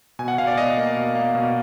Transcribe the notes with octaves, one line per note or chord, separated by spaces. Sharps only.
B2 G#5
F#5
B2 F5
D5
B2 D#5
A#3
B2
A#3
B2